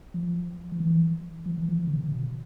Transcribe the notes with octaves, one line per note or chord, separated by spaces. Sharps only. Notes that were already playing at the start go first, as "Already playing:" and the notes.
F3
F3
E3
F3
E3
F3
E3
D3
C3
D3
B2